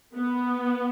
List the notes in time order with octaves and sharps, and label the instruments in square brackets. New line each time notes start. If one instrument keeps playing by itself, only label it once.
[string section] B3